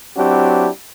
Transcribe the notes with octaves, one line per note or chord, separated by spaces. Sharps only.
F#3 C4 D4 E4 F#4 G4